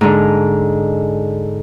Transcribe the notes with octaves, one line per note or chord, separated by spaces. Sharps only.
G#2 D3